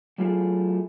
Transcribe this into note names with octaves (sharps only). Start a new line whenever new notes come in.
F#3 A3 E4 F4 G#4